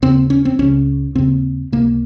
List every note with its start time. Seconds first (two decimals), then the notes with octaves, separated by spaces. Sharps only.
0.02 D#2 C#3 C4
0.30 C#4
0.45 C4
0.59 C#2 C#3 C#4
1.15 D#2 C#3 C4
1.72 C#2 C3 A#3